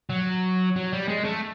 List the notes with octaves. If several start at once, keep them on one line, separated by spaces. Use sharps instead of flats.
F#3
F#3
G3
G#3
A3